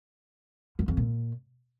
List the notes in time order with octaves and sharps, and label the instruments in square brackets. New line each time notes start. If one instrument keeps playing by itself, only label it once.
[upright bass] F#2
F2
A#2